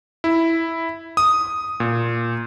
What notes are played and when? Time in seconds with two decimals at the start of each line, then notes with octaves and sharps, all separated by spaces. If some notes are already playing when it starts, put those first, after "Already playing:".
0.24 E4
1.17 D#6
1.80 A#2